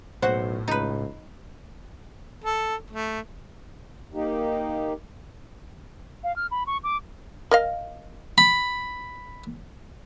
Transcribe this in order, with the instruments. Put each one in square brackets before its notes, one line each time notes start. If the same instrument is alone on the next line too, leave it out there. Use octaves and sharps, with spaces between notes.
[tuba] B1 [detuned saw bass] A2 [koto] F#4 F#5 [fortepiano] C5
[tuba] C#2 [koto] D#4 B4
[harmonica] A4
A3
[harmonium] A#3 D#4 G4
[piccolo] F5
F6
B5
C#6
D6
[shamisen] A#4 D#5 F5
[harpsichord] B5